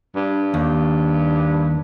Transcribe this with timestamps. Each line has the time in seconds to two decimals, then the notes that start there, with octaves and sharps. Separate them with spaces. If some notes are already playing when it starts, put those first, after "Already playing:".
0.16 G2
0.54 D#2